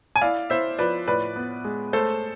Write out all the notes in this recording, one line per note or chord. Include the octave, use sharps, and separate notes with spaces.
G#5
E4 D5 F5
E4 C5 E5
F3 B4 D5
A2 B4 D5
B3
G#3
A3 A4 C5